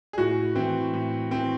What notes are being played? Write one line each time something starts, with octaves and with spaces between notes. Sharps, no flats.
G#4
A2 F#4
E3 C4
A2
E3 C4